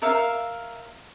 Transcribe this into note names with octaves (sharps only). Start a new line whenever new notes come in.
A#4 E5 F5